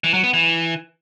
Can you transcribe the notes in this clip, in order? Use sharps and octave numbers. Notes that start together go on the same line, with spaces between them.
E3
F#3
B3
E3